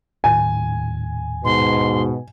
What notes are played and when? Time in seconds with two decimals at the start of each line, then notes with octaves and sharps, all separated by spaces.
0.24 D#1 A2 D#3 G#5
1.45 G#2 B2 C6